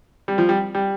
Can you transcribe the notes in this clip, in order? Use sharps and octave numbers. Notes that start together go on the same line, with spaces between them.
G3
F3
G3
G3